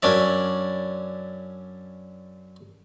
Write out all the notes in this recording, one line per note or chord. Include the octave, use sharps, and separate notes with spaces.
F#2 C#4 D4 D5 E5